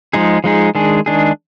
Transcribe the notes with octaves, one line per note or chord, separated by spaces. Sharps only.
F3 G#3 D#4 G#4
F3 G#3 D#4 G#4
D#3 G#3 D4 G#4
D#3 G#3 D4 G#4